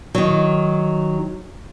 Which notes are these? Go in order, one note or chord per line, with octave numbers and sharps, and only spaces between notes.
D#3 F#3